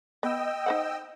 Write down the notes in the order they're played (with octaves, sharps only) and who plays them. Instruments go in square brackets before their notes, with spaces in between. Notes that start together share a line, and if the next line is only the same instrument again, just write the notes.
[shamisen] B3 [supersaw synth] D#5 G5 E6
[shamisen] D#4 C5 F#5